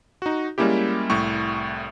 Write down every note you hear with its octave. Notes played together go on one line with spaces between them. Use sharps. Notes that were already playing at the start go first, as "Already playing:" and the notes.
D#4 F#4
G3 G#3 A#3 C#4 E4 G4
C2 A2 C#6